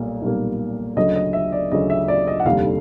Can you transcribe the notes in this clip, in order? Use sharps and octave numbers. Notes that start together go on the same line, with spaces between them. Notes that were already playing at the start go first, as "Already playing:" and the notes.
Already playing: B1 A#2 G3 A#3
B1 A#2 G3 A#3
D2 C#3 F#3 D#5
D#5
E5
D5
D2 C#3 F#3 D#5
E5
D5
D#5
F#5
F1 D#2 D3 G3 F5